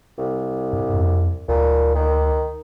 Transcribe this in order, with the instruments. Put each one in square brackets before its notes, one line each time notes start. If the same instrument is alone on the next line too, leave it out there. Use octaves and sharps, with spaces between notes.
[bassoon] C2
[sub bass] G2
F2
[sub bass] D2 [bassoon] A#2
[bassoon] D#3